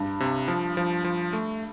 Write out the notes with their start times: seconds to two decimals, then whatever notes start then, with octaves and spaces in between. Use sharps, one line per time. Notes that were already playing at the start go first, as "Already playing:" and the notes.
Already playing: G2
0.20 C3
0.48 F3
0.77 F3
1.04 F3
1.33 A3